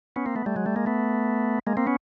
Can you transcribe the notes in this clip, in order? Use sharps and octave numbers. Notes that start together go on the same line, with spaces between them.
B3 C#4
A#3 C4
A3 B3
G3 A3
F#3 G#3
G3 A3
G#3 A#3
A3 B3
G#3 A#3
A#3 C4
B3 C#4